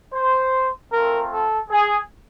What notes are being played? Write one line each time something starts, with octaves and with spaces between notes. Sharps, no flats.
C5
A3 C4 F4 A#4
A4
G#4